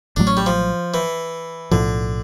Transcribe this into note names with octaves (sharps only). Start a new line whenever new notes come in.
A1 A2 F#3 A3 D4
C#4
G3
F3
E3
B1 A2 D3 F3